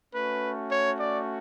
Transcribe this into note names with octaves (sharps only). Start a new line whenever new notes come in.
A3 C#4 F#4 B4
C#5
D5